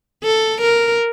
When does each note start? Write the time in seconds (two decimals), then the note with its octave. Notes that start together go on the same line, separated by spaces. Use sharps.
0.23 A4
0.62 A#4